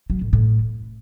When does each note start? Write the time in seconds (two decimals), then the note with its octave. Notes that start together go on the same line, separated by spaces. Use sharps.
0.10 F#3
0.21 A2
0.33 A2